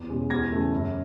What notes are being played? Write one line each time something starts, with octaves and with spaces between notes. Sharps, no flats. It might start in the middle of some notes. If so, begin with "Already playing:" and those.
Already playing: E2
B2 G#3 C#4
E2 G#6 A#6
C#3 E3 A3
F#2